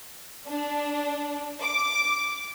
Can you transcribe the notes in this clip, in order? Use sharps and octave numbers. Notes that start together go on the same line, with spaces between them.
D4
D6